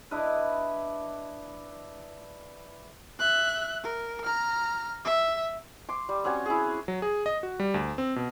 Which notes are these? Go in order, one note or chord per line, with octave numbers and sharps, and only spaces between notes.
D4 E4 B4 D#5
E5 F#6
A#4
A#5 F6
E5
C6 D6
G3
C4 C#4 F#4 C#5
E4 G#4
F#3
G#4
D#5
F#4
G3
D2
C4
B2